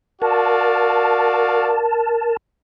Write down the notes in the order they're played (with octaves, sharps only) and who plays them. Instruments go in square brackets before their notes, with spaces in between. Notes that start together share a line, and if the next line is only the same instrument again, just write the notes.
[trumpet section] F#4 D5 F5 [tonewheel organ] A#4 A5